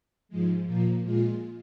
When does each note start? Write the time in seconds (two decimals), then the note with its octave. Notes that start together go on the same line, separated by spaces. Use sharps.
0.29 G#2 F3 G#3
0.66 A#2 F3 A#3
1.04 A#2 G#3 F4